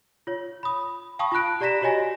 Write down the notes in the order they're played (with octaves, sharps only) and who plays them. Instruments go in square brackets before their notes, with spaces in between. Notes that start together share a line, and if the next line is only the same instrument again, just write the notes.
[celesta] F4 C#5
B5 D#6
F5 G5 A5 B5 C#6 D#6
F4 A5 B5 F#6 D7
G4 D5 A#5 A#6 B6 E7
F#4 G4 C#5 D#5 G#5 A#6